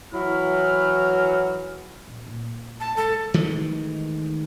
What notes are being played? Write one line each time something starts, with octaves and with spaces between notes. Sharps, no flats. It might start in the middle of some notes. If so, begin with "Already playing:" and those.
E3 F#3 E4 F6
A#1
A#2
A5
G#3 A4
D#3 E3 G#3 A3